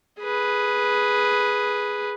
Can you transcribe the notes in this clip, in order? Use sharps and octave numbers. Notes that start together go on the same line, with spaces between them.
G#4 B4